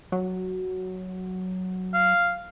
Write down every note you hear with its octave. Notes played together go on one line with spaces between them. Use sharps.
F#3
F5